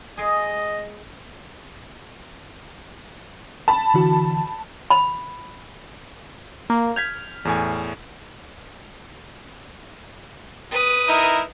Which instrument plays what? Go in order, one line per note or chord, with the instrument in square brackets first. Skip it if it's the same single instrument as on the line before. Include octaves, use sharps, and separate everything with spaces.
[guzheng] G#3 G#4 [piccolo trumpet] D#5
[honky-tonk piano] A5 B5
[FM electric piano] D3 E3 F#4
[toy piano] B5
[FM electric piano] A#3
[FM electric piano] F6 [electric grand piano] G6 G#6 B6
[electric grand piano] E2 A2 G#5
[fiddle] B4 D#6
[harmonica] D#4 E4 A#4